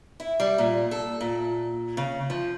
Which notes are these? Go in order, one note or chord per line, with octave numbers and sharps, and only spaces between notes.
E4
G3
A#2
A4
A#2
C#3
F3